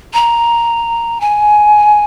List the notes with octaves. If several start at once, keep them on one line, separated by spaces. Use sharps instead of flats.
A#5
G#5